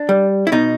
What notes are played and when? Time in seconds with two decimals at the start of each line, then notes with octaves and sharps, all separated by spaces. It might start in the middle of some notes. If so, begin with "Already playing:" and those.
Already playing: D4
0.09 G3
0.47 E4
0.52 B2 D#4